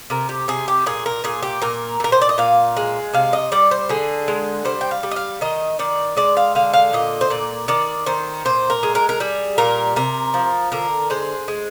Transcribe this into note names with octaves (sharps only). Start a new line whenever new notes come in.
C3 A#4
G4
C3 G#4
G4
A#2 G#4
A#4
A#2 G#4
G4
A#2 A#4
A#2 A#4
C5
D5
D#5
A#2 F5
G#3
C3 F5
D#5
G3 D5
C5
D3 G#4
G#3
G3 C5
G5
F5
G3
D#5
F5
D#3 D#5
D#3 D5
G#3 D5
F5
D3 F5
F5
A#2 D#5
C5
A#2 D5
D#3 D5
D#3 C5
A#2 C5
A#4
G#3
A#4
A#4
G3 G#4
A#2 A#4
C3 A#4
F3
D3 A#4
G#3 C5
G#3